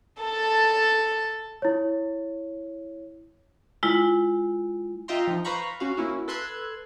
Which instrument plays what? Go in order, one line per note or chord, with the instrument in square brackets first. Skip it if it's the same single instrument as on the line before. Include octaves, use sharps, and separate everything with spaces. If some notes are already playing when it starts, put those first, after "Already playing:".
[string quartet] A4 A5
[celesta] E4 C#5
[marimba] G#3 E4 F4
[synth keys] F4 D#5 E5 G5 A#5 C6
F3 D#4
B4 C5 F5 A#5 B5 C#6
C#4 F#4 F5
A#3 C#4 E4 F#4
A4 B4 C6 E6 F#6 G#6